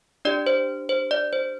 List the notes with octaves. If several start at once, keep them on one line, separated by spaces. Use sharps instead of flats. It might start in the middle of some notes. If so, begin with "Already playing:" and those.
D4 G4 D5
C5
C5
D5
C5